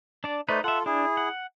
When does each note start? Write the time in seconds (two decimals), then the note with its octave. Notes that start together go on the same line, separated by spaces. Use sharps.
0.24 D4 D5
0.49 A3 D#4 B4 C5 D5
0.64 F4 A4 E5 F#5
0.86 D4 E4 G#4
1.17 F#5